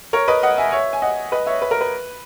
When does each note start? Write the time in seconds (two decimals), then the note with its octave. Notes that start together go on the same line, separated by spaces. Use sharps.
0.13 A#4 C#5
0.28 B4 D#5
0.43 D#5 F#5
0.58 E5 G#5
0.72 C#5 E5
0.93 G#5
1.02 D#5 F#5
1.32 B4 D#5
1.46 C#5 E5
1.62 B4
1.71 A#4
1.81 B4